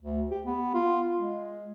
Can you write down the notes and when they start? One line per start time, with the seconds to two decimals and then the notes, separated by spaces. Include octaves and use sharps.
0.02 D2
0.31 G4
0.45 B3
0.74 F4
1.16 G#3